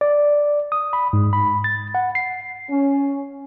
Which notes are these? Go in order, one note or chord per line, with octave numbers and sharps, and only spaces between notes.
D5
D#6
B5
G#2
B5
A6
F#5
C7
C#4